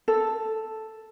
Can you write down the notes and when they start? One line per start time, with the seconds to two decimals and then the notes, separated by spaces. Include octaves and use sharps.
0.08 A4